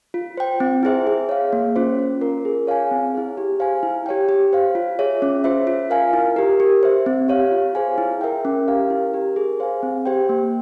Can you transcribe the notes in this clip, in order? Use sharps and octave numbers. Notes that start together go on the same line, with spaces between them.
F4
C5 G5
C4
E4 G#4 C5 E5
G#4
C#5 F5
A#3
C#4 F4 C5
C#4
F4 A#4
G#4
C#5 F5 G#5
C4
E4 G#4
G4
C5 F5 G#5
E4
G4 C#5 G5
G4
C5 F5
F4
G#4 C#5 E5
C#4
F4 C5 E5
F4
A#4 F5 G#5
E4
G4 A#4
G4
C5 E5
C4
G4 C#5 F5
F4
G#4 C5 F5 G#5
E4
A#4 E5 G5
C#4
G4 A#4 F5
E4
G4 A#4
G#4
C5 F5 G#5
C4
G4 C5 G5
A#3